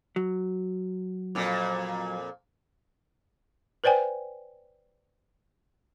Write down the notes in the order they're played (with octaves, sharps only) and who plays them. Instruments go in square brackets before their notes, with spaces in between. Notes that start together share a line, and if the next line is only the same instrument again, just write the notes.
[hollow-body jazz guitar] F#3
[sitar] F2 A#2
[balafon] B4 C5 D5 G5 G#5